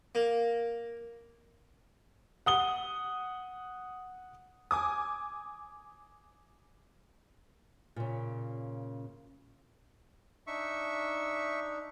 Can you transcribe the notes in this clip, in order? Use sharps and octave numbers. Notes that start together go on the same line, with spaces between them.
A#3
F#5 D#6 G7
G#5 D6 D#6
A#2 C#3
D4 D#4 E5 C#6